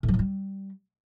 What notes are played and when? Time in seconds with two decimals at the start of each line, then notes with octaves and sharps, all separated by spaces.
0.03 A2
0.08 F#3
0.14 A2
0.19 G3